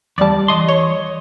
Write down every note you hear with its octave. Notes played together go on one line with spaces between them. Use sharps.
E2 G3 D5 A5
E3 D#5 C6
C#5